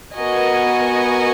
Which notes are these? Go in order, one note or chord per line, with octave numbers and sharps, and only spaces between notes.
B3 F#4 A#4 D#5 G#5